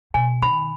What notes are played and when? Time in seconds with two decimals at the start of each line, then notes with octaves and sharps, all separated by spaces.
0.14 B2 G#5
0.42 D#3 B5